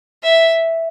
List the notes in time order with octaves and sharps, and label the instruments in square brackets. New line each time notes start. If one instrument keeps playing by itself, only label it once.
[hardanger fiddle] E5